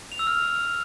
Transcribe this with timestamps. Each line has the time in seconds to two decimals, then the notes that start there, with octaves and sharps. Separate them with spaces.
0.12 F7
0.19 E6
0.27 F6